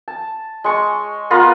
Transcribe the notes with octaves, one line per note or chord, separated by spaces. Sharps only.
A5
G#3 C#6
B3 F4 A#4 B4